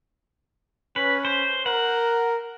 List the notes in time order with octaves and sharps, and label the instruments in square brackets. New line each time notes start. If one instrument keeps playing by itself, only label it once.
[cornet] C#4 [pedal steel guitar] B4
[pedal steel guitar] C5
[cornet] A#4 [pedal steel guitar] F#5